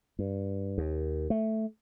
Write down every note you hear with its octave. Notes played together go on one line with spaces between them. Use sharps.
G2
D#2
A3